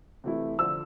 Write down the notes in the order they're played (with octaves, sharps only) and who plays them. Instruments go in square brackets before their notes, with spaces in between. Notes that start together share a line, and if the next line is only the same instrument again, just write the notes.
[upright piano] C3 E3 A3 E4
[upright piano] D3 F3 [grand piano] E6